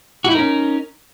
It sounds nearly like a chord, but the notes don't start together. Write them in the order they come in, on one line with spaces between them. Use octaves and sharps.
F#4 E4 D#4 A#4 C#4